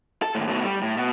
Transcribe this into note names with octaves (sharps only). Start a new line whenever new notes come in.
A4
D#2 A2
B2 A3
G3
A2
B2